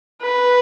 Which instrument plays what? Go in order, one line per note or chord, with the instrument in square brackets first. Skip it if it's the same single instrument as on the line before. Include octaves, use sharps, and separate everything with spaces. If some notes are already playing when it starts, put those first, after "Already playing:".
[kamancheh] B4